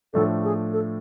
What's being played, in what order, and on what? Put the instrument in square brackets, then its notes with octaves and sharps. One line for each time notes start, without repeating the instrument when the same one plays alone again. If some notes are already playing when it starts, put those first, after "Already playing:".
[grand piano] A2 F3 A3 D4 [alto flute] A4
[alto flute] G#4
A4